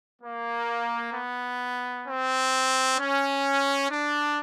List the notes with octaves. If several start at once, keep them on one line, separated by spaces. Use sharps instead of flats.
A#3
B3
C4
C#4
D4